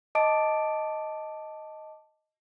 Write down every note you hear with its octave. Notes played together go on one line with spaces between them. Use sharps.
D#5 A5 D6 D7